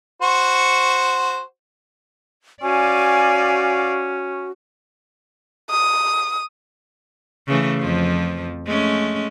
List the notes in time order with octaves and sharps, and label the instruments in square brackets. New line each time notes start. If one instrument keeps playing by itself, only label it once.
[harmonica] F#4 C5 C#6
[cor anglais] C#4 [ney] F#4 [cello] D5 F5 [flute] G#5
[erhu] D#6
[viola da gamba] C#3 E3 A3
F2 F3
G#3 A3 C#4